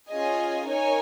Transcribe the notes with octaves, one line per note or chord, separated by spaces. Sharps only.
C#4 F4 G#4 D#5 G#5
D#4 A#4 C#5 G#5